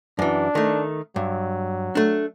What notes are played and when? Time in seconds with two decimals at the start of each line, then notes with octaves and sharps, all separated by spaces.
0.19 F#2 E3 D4
0.55 D#3 A3
1.16 G2 F#3
1.95 A3 D4